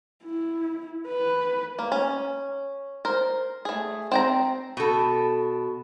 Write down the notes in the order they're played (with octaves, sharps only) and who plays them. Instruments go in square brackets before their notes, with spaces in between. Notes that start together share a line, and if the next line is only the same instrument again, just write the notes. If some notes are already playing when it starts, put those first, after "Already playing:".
[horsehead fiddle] E4
B4
[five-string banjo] A#3
C#4
A#4 C5
A3 G#4
C4 G5 A#5
[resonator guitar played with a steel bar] B2 A4